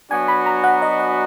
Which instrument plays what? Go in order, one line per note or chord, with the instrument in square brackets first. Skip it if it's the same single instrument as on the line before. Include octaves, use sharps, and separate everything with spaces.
[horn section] F#3 B3 D4 F#4 [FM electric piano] G#5
[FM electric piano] B5
A#5
F#5
D#5
F#5